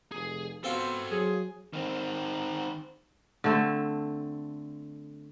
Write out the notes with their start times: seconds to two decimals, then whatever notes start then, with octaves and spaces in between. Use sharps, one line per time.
0.12 F1 G#4
0.64 B3 C4 F4 F#4 A4 G5
1.11 F#3 G#4
1.73 D#3 C4
3.44 D3 A3 C4